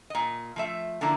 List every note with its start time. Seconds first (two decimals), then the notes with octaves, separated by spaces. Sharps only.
0.10 A#2 D#5
0.56 F3 A3 E5
1.01 D3 F3 A#3 E4